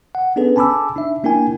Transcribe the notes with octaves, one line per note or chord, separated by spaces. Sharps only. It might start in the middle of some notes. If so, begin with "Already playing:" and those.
F#5
B3 C#4 D4 G#4 A4 B4
G#5 A5 B5 D6 E6
D4 D#4 E5
A#3 D4 E4 A#4 G5 G#5